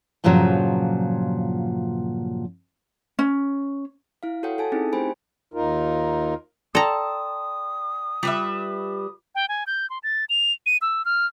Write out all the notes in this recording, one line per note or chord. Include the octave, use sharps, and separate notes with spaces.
G2 A#2 C#3 F3 F#3
C#4
E4 F5
F#4 A4 C#5 F#5 G5
A4 G#5 A5
C4 C#4 D#4 E4 G#4
A3 G4 C5 G5 G#5 B5
D#2 D#4 F4 A#4
A4 D5 G5 A5 A#5 C6 D#6
G3 F4 B4 E5
G5
G#5
G6
C6
A6
F7
D#7
E6
F6